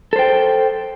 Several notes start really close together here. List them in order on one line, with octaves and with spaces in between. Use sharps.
A4 C5 G5